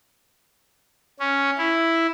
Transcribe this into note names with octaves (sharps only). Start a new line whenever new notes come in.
C#4
E4